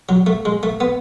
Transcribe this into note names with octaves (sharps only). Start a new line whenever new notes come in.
F#3
A3
G#3
A3
B3